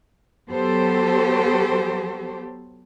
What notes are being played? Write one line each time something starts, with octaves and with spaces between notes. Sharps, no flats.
F#3 B3 G4 A4 C5